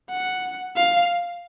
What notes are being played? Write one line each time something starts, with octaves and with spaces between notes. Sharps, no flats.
F#5
F5